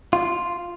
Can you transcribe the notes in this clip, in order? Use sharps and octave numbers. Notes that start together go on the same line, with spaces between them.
F4